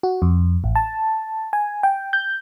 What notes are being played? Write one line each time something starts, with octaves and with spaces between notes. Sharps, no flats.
F#4
F2
A1
A5
G#5
G5
G6